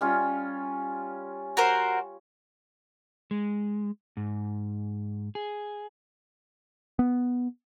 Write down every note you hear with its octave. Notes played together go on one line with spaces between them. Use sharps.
G3 C#4 F4
F#4 A#4 C5
G#3
G#2
G#4
B3